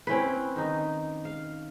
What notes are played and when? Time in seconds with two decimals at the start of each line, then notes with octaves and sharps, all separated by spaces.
0.07 C4 C#4 E4 B4
0.56 D#3 D#4 D#5
1.25 F5